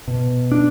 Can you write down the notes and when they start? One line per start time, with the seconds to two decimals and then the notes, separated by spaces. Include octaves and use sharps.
0.08 B2
0.52 D4